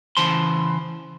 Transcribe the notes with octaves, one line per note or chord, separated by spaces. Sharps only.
C#3 E3 C5 A5 C6